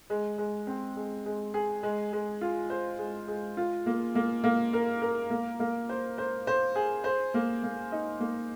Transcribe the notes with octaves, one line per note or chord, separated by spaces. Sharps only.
G#3
G#3
C4
G#3
G#3
G#4
G#3
G#3
F4
C5
G#3
G#3
F4
A#3
A#3
A#3
A#4
A#4
A#3
A#3
C5
C5
C5
G#4
C5
A#3
A#3
D#4
A#3